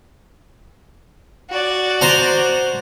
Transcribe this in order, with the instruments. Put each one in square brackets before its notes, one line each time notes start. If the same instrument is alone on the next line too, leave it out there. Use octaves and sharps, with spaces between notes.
[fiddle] F#4 D5
[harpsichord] C5 A#5